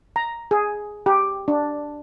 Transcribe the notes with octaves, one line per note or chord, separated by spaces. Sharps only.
A#5
G#4
G4
D4